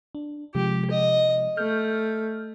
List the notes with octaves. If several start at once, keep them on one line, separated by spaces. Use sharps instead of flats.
D4
C3 F3 G#3 G4
D#5
A3 F6 G6